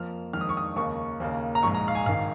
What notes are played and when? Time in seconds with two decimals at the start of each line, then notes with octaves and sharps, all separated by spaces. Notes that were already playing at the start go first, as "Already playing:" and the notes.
Already playing: F2 F3 A#3 F6
0.33 F2 D#3 G#3 F6
0.41 D#6
0.49 C#6
0.57 D#6
0.76 D#2 C#3 A#3 C#6
1.20 D#2 C#3 A#3
1.55 A#5
1.63 A#1 G#2 G#3 C#6
1.74 A#5
1.88 F5
1.95 G#5
2.06 G#1 G#2 D#3 F5